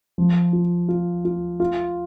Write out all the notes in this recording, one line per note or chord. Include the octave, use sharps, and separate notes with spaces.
F3
F4
F4
F4
F4